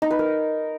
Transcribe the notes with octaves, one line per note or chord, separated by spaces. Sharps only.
D#4
B4
A#4